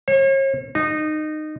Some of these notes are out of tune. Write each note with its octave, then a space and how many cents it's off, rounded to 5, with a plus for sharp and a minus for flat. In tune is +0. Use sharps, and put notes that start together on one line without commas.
C#5 -40
D#4 -20